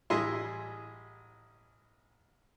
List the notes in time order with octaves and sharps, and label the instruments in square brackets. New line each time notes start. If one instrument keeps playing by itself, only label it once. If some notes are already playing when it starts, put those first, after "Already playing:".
[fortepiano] A1 G3 E4 G#4 D#5 C6